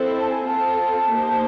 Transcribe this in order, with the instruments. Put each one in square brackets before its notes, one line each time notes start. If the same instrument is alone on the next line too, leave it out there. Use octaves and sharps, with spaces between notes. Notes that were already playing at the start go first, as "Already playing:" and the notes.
Already playing: [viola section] C4 E4 A4 C5
[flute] D#5
A5
G#5
[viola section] C4 F4 A4 [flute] A5
[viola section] A#3 D#4 G4 C5